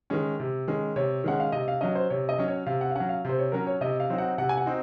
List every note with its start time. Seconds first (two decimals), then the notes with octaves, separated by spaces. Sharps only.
0.10 D#3 G#3 C#4
0.40 C3
0.68 D#3 G#3 C#4
0.96 C3 C#5
1.24 D#3 G#3 C#4 F#5
1.40 F5
1.52 C3 D#5
1.68 F5
1.81 F#3 C#4 D#5
1.95 C5
2.10 C3 C#5
2.29 D#5
2.38 F#3 C#4
2.48 C#5
2.66 C3 F5
2.81 F#5
2.91 F5
2.96 F#3 C#4 F#5
3.09 F5
3.25 C3 C5
3.39 C#5
3.52 F#3 C#4 A#4
3.67 C#5
3.81 C3 D#5
4.00 F5
4.10 F#3 C4 D#4 F#4
4.18 F#5
4.38 C3 F#5
4.49 G#5
4.58 F#5
4.66 C4 D#4 F#4